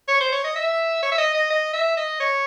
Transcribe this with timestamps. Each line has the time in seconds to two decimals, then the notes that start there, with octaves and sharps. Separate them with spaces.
0.08 C#5
0.20 C5
0.32 C#5
0.44 D#5
0.56 E5
1.02 C#5
1.12 E5
1.18 D#5
1.34 D#5
1.50 D#5
1.73 E5
1.97 D#5
2.20 C#5